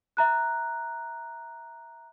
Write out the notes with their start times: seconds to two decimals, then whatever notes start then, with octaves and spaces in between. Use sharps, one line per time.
0.17 E5 A#5 F#6